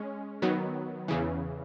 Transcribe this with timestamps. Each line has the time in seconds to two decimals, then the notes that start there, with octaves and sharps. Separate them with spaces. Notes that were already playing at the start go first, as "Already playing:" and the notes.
Already playing: G#3 C#4
0.42 D#3 F#3 B3
1.08 E2 C#3 E3